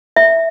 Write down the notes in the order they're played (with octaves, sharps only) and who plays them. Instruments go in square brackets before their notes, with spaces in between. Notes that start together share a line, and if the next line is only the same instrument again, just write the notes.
[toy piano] E5